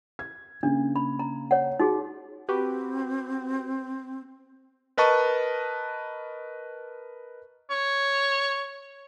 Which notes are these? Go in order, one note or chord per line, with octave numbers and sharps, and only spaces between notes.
G#6
C#3 A#3 D4
B5
A#5
C#5 F#5
D#4 F#4 G#4
C4 F#4 G4 B4
A#4 B4 D#5 A5 C#6
C#5